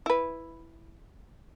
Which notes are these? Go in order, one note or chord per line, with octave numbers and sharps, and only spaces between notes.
E4 B4